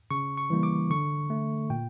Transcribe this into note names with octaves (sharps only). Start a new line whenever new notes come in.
C#3 C#6
C#6
E3 G3 A#3
D6
D3 C#6
A3
A#2 G5